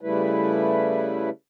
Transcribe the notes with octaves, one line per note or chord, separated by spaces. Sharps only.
C#3 G3 A3 E4 B4